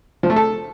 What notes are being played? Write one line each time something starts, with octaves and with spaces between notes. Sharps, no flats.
F3
A3
A4